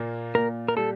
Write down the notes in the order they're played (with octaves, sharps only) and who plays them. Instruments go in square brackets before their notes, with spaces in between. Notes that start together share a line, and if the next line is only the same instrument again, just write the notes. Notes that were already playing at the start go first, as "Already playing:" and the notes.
Already playing: [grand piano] A#2 A#3
[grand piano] A#2 [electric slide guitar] A#4
[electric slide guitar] A#4
[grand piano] G3 [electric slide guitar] A4